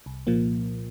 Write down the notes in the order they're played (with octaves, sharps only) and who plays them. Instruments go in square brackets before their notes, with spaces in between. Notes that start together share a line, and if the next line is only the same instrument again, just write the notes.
[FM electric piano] C2
A#2 F3 A#3